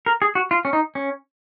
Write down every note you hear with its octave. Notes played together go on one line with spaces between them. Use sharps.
A#4
G#4
F#4
F4
C#4
D#4
C#4